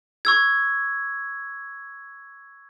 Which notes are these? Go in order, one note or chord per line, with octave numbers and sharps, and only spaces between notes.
C#6 E6 G#6